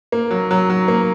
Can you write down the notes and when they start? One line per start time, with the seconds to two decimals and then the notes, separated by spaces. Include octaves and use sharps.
0.12 A#3
0.31 F#3
0.51 F#3
0.70 F#3
0.88 A#3